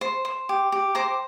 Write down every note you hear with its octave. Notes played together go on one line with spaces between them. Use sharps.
C5
C5
G4
G4
C5 A#5 D6